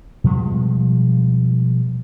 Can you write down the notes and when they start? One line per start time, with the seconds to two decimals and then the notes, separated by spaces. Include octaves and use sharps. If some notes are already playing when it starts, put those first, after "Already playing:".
0.24 B2 F3 G3 G#3